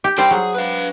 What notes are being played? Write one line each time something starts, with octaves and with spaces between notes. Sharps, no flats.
G4
G3 D4 C5 D5 G5
F#3 G#4
B4 F5